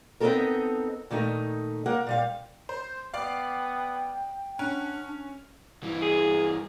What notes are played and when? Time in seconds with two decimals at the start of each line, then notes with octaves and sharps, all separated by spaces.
0.20 B3 C4 D4 D#4 A4 A#4
1.11 A#2 D#3 A3 D#4
1.86 A#3 A#4 F#5
2.07 A#2 G3 F5
2.69 C5
3.14 B3 D5 F5 G5
4.59 C#4 D4 F#5
5.83 G2 E3
6.02 G#4